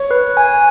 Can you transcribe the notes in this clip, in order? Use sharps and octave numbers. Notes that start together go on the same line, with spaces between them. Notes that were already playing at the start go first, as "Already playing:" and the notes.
Already playing: C#5
B4
G#5